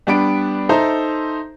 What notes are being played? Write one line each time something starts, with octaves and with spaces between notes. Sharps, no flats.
G3 B3 D4 B4 B5 D7
D#4 A4 C5 E5 A#5